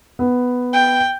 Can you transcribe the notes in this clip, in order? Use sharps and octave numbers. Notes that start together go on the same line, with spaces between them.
B3
G5